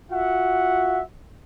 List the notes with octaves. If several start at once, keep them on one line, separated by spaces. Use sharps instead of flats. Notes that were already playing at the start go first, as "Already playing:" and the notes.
F4 F#4 E5 F#5